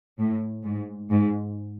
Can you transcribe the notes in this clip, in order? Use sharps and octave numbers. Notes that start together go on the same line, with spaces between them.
A2
G#2
G#2